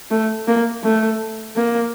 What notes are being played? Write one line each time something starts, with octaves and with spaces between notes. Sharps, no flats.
A3
A#3
A3
A#3